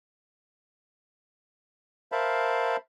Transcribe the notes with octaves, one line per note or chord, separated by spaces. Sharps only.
A#4 C5 E5 F5 A5 B5